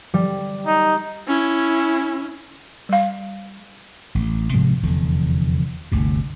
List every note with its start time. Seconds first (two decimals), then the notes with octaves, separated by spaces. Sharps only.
0.14 G3
0.67 D#4
1.28 C#4 E4
2.89 G3 F5
4.15 A1
4.54 G#2 C3 F3 G#3
4.82 F1 E2 D3
5.92 G1 D2 C3